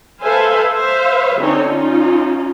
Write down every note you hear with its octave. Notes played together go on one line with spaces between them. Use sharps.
A4 B4 C5 E5 F5 G#5
C5 E5 F5
D3 C4 C#4 D#4 C#5
C#4 D#4 F4